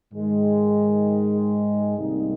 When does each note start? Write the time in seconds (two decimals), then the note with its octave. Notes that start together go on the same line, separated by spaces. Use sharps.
0.13 G#2 D#3 G#3
1.98 C2 C3 G3 A#3 D#4